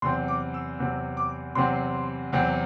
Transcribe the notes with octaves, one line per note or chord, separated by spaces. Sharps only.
E2 C3 F#3 C4 C6
D6
E6
E2 C3 F#3 C4
D6
E2 C3 F#3 C4 C6
E2 C3 F#3 C4